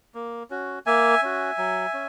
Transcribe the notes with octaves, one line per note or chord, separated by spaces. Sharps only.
A#3
C#4 F#4
A#3 E5 G#5
C#4 F#4
F#3
C#4